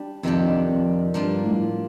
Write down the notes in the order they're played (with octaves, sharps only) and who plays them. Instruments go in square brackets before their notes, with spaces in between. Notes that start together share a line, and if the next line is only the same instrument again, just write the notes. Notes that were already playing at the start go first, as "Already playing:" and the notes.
Already playing: [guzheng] G3 D4 G4
[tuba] F2 [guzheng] C3 D#3 G3 D4 G4
[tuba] F2
[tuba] G2 [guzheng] F3 A#3 D4 F4
[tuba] A2